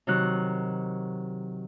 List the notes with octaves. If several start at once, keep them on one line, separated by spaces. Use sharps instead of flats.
C3 D#3 F#3 F#6